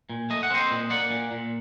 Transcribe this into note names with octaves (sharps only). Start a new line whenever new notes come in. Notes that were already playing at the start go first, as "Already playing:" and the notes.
A#2
A3 D#5
F#5
C4 C5 D#5
A#2
A#3 D5 F#5
A#2
A#2